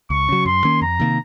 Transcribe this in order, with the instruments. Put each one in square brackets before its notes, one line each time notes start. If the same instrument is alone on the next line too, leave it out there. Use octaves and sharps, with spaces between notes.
[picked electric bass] C#2 [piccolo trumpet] C#6
[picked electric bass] C#3 F#3
[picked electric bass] F#2 [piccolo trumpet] C6
[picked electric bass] D#3 A#3 C#4
[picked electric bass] F2 [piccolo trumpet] A#5
[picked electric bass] C3 D#3 A#3